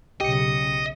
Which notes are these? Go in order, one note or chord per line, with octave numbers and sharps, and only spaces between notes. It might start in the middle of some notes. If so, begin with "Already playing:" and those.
B1 C#3 G4 D#5 C#7